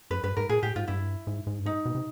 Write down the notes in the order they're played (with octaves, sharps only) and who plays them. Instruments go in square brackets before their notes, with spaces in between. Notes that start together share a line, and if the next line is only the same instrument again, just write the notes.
[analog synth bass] F#2 [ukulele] B4
[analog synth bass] G2 [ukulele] B4
[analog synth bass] G#2 [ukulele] A#4
[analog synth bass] A#2 [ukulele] G#4
[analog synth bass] A2 [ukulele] G4
[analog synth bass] G#2 [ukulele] F4
[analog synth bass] G2 [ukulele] E4
[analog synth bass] G#2
G#2
G2
[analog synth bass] G#2 [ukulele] D#4
[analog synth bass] B2
C3